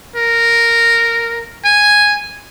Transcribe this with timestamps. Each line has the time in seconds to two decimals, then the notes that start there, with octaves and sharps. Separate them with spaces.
0.16 A#4
1.65 G#5